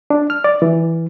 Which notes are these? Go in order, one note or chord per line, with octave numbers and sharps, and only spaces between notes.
D4
F6
D5
E3